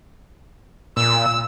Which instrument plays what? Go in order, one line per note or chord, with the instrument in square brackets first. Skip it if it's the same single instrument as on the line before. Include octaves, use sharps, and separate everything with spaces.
[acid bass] A#2 [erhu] E6